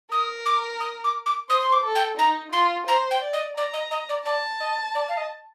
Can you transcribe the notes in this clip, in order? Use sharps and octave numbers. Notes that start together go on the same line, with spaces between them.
A#4 D#6
D6
D#6
D6
D6
C5 D#6
C6
D6
A4
G5
D#4 A#5
F4 C6
C5 A#5
G5
D5
D#5
D5 A#5
D#5
D#5
D5
D5 A5
D#5
D5
F5
D#5